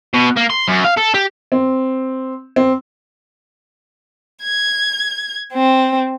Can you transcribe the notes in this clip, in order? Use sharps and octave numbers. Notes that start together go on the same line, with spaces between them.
B2
A#3
C6
F#2
F5
A4
G4
C4
C4
G#6
C4